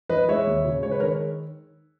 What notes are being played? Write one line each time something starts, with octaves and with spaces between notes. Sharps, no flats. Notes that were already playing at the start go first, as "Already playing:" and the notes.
E3 B4 D#5
G#3 C#5 E5
D#2
C#3
G#3 C#5
B4
D#3 A#4 C#5